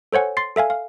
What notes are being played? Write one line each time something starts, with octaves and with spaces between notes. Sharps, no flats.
A4 C5 C#5 F#5 G#5
C6 A6 C7
A4 E5 F5 G#5
F5